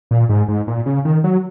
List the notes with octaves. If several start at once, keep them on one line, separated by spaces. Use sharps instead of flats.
A#2
G#2
G#2
A#2
C#3
D#3
F#3